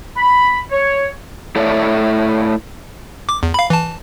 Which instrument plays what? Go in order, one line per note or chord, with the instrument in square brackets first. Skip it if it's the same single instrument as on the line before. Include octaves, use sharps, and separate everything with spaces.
[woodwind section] B5
C#5
[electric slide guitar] A3 E4 A4 C#5 D5 E5
[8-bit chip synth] D6
E2
F5 B5
E3 A5